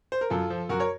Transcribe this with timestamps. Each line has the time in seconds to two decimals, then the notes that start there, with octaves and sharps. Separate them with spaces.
0.12 C5
0.21 A#4
0.30 F#2 F4 A4
0.50 F3
0.69 F#2 F#4 A#4
0.80 A#4 C#5